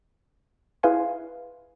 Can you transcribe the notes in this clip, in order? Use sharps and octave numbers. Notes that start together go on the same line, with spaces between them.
E4 G#4 B4 F5 G#5 C6